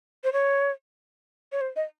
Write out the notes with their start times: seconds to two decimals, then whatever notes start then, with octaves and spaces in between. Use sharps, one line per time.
0.24 C5
0.33 C#5
1.52 C#5
1.61 C5
1.76 D#5